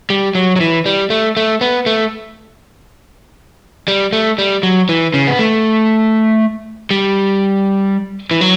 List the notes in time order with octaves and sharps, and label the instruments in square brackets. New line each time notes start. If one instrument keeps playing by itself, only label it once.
[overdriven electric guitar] G3
F#3
F#3
E3
G3
A3
A3
B3
A3
G3
A3
G3
F#3
E3
C#3
B3
A3
G3
E3
F#3